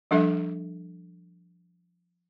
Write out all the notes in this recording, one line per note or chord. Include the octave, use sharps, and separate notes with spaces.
F3 G3 D4 A4 E5